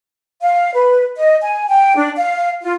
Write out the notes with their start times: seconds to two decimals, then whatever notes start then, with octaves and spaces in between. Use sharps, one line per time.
0.42 F5
0.74 B4
1.16 D#5
1.42 G#5
1.68 G5
1.96 D4
2.17 F5
2.62 F4